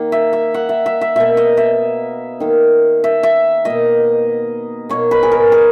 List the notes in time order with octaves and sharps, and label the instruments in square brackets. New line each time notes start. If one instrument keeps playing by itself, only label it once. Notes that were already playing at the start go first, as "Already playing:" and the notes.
Already playing: [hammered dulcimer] D#3 A#3
E5
E5
F#5
E5
E5
E5
B2 A#3 E5
D#5
E5
D#3 A#3
E5
E5
B2 A#3 D#5
B2 A#3 C#5
B4
G#4
A#4
G#4